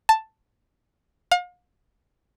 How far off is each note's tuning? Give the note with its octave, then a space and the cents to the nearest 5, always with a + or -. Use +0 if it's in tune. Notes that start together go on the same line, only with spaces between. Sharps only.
A5 +5
F5 +40